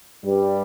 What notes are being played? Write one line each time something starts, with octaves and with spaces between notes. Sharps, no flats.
G2 G3